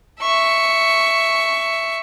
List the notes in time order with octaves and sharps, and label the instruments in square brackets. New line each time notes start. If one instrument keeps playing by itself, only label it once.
[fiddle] E5 C#6